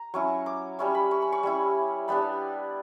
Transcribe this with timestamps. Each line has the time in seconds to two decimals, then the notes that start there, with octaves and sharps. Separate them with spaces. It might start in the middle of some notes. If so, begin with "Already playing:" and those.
Already playing: A#5
0.14 F#3 C#4 E4 C#6
0.46 D6
0.79 G3 C#4 E4 C#6
0.95 B5
1.11 C#6
1.22 B5
1.32 C#6
1.43 G3 C#4 E4
2.08 G3 B3 D4 B5